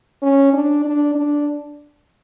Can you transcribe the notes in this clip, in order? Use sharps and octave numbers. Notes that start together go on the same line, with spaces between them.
C#4
D4
D4
D4